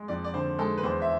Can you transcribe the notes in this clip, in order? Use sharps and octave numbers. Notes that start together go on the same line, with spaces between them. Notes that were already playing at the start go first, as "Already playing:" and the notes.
Already playing: G#3
F2 D5
D5
D3 C5
G#3 A4
B4
E2 C5
E5